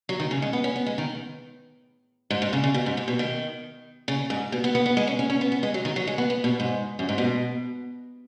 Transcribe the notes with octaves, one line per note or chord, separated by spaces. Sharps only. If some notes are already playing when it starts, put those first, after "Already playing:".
F#3
D#3
C#3
G#3
B3
C#4
B3
G#3
D#3
G#2
G#2
C#3
C#3
B2
G#2
G#2
B2
D#3
C#3
G#2
B2
B3
B3
B3
G#3
C#4
C#4
C#4
B3
B3
G#3
F#3
D#3
F#3
G#3
B3
B3
B2
G#2
F#2
G#2
B2